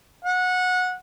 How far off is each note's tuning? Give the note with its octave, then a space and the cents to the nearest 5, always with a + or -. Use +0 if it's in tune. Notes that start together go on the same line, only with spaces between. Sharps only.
F#5 -20